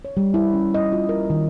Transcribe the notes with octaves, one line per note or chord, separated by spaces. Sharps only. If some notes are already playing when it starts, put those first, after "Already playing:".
C#5
G3
E4
C#4
D#5
F4
A#4
D#3